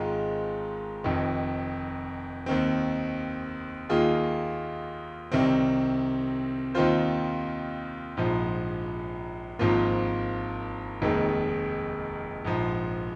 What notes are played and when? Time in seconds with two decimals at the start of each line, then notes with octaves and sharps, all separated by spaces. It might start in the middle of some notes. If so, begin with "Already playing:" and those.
Already playing: G#1 G#2 D#3 G#3 F4
1.04 F1 F2 D#3
2.46 D#2 D#3 C4
3.89 D#2 D#3 A#3 F4 G#4
5.32 C2 C3 D#3 C4
6.75 D#2 D#3 C4 F4 C5
8.17 A#1 G#2 F3
9.59 G#1 G#2 F3 A#3 F4
11.02 F1 D#2 D#3 G#3
12.45 A#1 G#2 F3